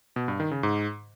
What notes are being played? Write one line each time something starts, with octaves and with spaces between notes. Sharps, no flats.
B2
G2
D#3
C#3
G#2